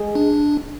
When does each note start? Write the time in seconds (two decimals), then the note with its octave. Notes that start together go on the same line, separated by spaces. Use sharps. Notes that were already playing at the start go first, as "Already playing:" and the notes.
Already playing: G#3 G#4
0.15 D4